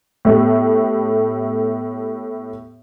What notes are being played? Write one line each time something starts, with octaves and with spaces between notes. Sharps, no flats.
A2 A3 B3 G4